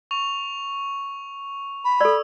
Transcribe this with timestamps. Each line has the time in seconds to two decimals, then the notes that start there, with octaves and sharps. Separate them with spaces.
0.11 C#6 F7
1.85 B5
2.01 A4 D5 E6